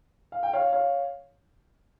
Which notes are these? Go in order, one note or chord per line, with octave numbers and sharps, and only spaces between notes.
F5
G5
C#5 F5
C#5 F5